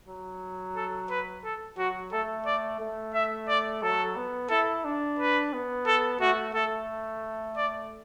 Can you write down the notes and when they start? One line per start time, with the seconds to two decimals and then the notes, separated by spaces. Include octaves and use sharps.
0.08 F#3
0.76 A4
1.10 B4
1.45 A4
1.78 F#3 F#4
2.12 A3 A4
2.46 D5
2.80 A3
3.14 E5
3.49 D5
3.83 F#3 A4
4.16 B3
4.50 E4 A4
4.85 D4
5.19 B4
5.53 B3
5.87 A4
6.21 A3 F#4
6.55 A3 A4
7.57 D5